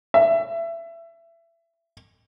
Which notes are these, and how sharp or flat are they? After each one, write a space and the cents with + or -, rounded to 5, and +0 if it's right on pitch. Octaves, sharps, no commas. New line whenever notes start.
E5 +25